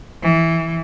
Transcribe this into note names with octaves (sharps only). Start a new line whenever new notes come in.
E3